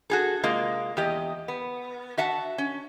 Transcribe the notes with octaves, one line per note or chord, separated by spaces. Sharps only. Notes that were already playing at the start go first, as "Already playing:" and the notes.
F#4 G#4 A4
C3 G#3 A#3 F4
E2 G4 D#5
B3
F#4 E5 F#5 A5
C#4